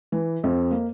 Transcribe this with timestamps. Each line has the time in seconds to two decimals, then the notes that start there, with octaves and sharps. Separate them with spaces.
0.12 E3
0.44 F2
0.71 A#3